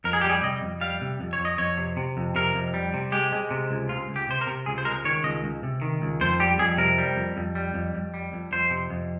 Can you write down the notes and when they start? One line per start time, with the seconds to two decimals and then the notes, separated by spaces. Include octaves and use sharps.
0.04 F2 A#4
0.13 G#4
0.21 G4
0.24 G3
0.29 G#4
0.43 C3 D#5
0.63 F2
0.81 G3 F5
1.01 C3
1.21 F2
1.33 C#5
1.39 F2
1.45 D#5
1.58 F2 C#5
1.78 C3
1.97 C3
2.17 F2
2.35 C3 A#4
2.55 F2
2.74 G3
2.94 C3
3.12 G#3 G4
3.32 G#3
3.51 C3
3.71 C#2
3.89 C#2 F4
4.09 C#2
4.16 G4
4.28 C3 C5
4.41 A#4
4.47 C3
4.66 C#2 G#4
4.78 C5
4.85 G#3 A#4
5.04 D#3 C#5
5.24 C#2 D#5
5.44 C#2
5.63 C3
5.82 D#3
6.02 C#2
6.21 F2 C5
6.40 G3 G4
6.59 F2 G#4
6.78 C3 A#4
6.98 G3
7.16 F2
7.37 F2
7.55 G3
7.74 F2
7.95 F2
8.14 G3
8.33 F2
8.52 F2 C5
8.71 C3
8.90 F2